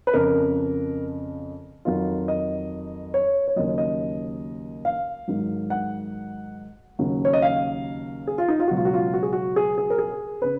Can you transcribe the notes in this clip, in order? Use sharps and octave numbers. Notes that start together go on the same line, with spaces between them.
B4
F2 C#3 F3 A#4
F2 D#3 F#3 F4
D#5
C#5
C#5
D#2 C#3 F#3 D#5
D#5
F5
G#2 D#3 F#3
F#5
D#2 C#3 F#3
C#5
D#5
F5
G#4
F4
D#4
F4
C#2 B2 F#3 F#4
F4
F#4
F4
F#4
G#4
F#4
G#4
G#4
A#4
G#4
C#3 B4